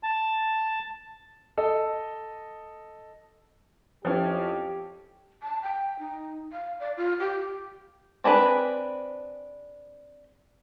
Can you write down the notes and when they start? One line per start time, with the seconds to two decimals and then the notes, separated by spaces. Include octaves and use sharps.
0.03 A5
1.57 A4 D#5
4.05 F2 F3 C#4 E4 G4
5.42 A5
5.63 G5
5.99 D#4
6.52 F5
6.80 D5
6.97 F4
7.20 G4
8.24 C4 D4 G#4 B4